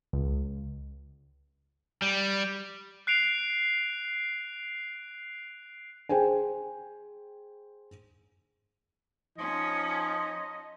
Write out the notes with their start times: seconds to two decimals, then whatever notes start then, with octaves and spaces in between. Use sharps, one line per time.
0.13 C#2
2.02 G3
3.07 F#6 C7 D7 F7
6.09 G#4 C5 G5 G#5
9.38 F3 C#4 D#4 D#5